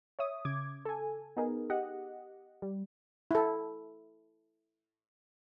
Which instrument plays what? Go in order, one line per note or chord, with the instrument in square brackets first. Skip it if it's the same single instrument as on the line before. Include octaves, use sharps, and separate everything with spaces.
[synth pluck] C#5 E5 D#6
C#3 D6 G#6
A4 G#5
B3 D#4 G#4 A#4
G4 D#5 F#5
G3
[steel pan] E4 A4